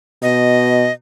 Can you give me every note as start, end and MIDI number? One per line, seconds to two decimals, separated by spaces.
0.22 0.88 47
0.22 0.92 75